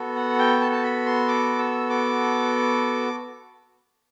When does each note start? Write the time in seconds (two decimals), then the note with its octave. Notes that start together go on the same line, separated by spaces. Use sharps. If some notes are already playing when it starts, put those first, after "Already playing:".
Already playing: B3 F#4 A4
0.16 F#5
0.38 G5
0.61 A5
0.72 A5
0.83 B5
1.06 C6
1.28 D6
1.58 E6
1.89 D6